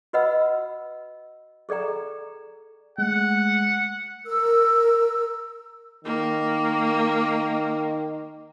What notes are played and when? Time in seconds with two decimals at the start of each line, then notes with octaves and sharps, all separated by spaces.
0.13 F#4 B4 D#5 F#5 B5 E6
1.69 G#4 A4 D5 G5 A#5
2.98 G#3 A3 F#5
4.26 A#4 E6
6.04 D#3 A#3